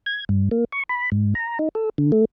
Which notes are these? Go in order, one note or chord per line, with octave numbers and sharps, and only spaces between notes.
G#6
G2
A#3
C#6
B5
G#2
A#5
D#4
A4
D3
A3